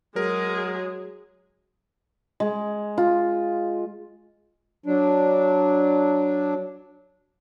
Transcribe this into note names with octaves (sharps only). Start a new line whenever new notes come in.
F#3 G#3 G#4 A#4
G#3
F4
F#3 D4